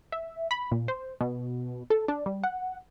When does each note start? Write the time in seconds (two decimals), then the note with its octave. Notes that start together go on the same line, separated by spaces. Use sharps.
0.12 E5
0.51 B5
0.71 A#2
0.88 C5
1.21 B2
1.90 A4
2.08 D4
2.26 G3
2.44 F#5